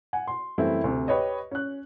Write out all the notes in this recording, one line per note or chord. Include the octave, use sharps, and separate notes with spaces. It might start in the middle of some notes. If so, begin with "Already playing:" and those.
F#5 G#5
C6
F#2 E3 G3 A3 C4 E4
D2 C3
G4 B4 C#5 D#5
C#4 F#6